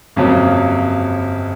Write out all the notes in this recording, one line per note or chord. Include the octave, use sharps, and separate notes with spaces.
G1 F2 C#3 F#3 A#3